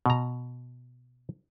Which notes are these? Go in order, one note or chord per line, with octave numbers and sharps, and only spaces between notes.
B2 A#5